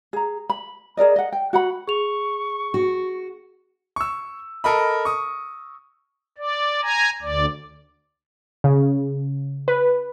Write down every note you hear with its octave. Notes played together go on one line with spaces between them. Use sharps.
G#4 A#5
B5
G#4 A#4 D5 D#5
D#5 F#5
G5
F#4 F#5 B5
G#4 C#6 F7
F#4
C#6 E6
A4 A#4 D#5 B5
C#6 D#6
D5
G#5 A#5
D2 D5
C#3
B4